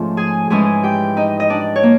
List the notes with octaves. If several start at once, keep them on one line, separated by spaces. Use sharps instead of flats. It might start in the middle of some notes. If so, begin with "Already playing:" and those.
Already playing: G#2 F3 A3 C#4 F4
G#4 G#5
G#2 E3 G#3 C#4 G#4 G#5
G4 G5
D#4 D#5
D#5
D4 D5
C#5
A#3